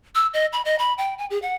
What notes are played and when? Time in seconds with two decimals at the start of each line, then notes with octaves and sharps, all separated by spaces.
0.15 E6
0.34 D#5
0.53 B5
0.65 D#5
0.79 B5
0.98 G5
1.18 G#5
1.30 G#4
1.42 F#5